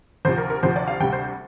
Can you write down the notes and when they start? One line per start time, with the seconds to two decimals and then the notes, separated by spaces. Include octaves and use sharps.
0.25 D2 C3 F3 C5
0.38 A#4
0.50 A#4
0.63 D2 C3 F3 C5
0.76 D5
0.88 F5
1.00 D2 C3 G3 G5
1.13 C5